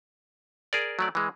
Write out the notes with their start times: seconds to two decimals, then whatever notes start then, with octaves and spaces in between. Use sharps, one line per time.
0.73 G#4 A#4 D5
0.99 F#3 A3 D5
1.15 E3 G#3